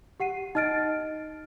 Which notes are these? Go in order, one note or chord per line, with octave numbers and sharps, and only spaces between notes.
G4 F#5 C7 D#7
D#4 D#5 F6 A6 D7